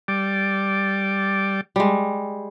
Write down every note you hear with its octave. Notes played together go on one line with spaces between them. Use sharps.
G3 D5
G3 G#3